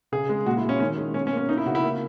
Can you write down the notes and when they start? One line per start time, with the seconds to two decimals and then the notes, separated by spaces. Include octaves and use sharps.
0.12 C#3 G#4
0.29 G#3
0.46 A#2 F#4
0.57 E4
0.63 G#3
0.69 C#4
0.80 D#3 C#4
0.98 G#3
1.14 B2 C#4
1.27 C#4
1.32 A#3
1.37 C#4
1.49 A#3 D#4
1.58 E4
1.66 C#3 F#4
1.75 E4
1.83 A#3